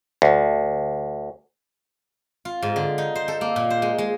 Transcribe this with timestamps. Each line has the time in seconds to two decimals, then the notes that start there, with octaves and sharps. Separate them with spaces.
0.22 D2
2.45 F4
2.62 G#2
2.76 D3
2.98 D#4
3.15 C5
3.28 A4
3.41 A#3
3.56 A#2
3.70 C5
3.82 G#3
3.98 G#3